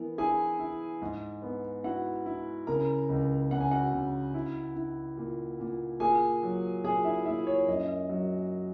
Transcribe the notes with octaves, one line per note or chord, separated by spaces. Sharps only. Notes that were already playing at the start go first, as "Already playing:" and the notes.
Already playing: E3 B3 A#4
E4 G#4 G#5
E4
G#2
B3
E4 F#4 F#5
E4
C#3 A#4 A#5
C#2
C#3 F#5
G#5
F#4 F#5
C#3
E4
E4
A#2
A#2
A#2 G#4 G#5
F#3
A#2 G#4 G#5
E4 E5
A#2 E4 E5
C#5
F#2 D#5
F#3